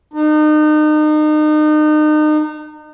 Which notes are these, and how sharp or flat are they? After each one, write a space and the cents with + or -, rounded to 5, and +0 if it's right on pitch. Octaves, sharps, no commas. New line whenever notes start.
D#4 -35